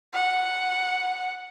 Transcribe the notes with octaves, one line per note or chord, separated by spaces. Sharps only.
F#5